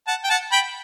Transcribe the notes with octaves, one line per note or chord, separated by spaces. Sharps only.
F#5 A5
G5
F#5 A5
G5 B5